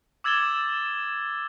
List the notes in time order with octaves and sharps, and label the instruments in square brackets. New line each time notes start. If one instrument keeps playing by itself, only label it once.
[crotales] D6 E6 G#6 A6 E7 G7